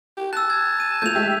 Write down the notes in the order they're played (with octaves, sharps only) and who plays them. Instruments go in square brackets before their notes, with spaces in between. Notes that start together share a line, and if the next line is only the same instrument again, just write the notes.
[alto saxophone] G4
[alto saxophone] A5 [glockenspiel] E6 F#6
[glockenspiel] G#6
D#7
[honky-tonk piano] A3 F4 [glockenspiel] G6 F7
[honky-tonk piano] G#3 G4 E5